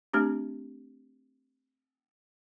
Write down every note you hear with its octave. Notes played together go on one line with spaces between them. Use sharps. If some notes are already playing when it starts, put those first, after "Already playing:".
A3 C4 D4 G4